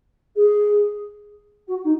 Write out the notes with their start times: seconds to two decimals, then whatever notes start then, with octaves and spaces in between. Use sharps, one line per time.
0.36 G#4
1.67 F#4
1.84 D#4